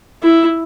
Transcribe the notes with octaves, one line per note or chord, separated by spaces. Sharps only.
E4